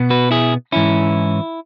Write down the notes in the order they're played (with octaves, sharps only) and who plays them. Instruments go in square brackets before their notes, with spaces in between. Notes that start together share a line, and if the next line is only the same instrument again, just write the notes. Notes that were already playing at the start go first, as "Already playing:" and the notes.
Already playing: [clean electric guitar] B2 B3
F#4 B4
E4 G#4
G#2 E3 C#4 E4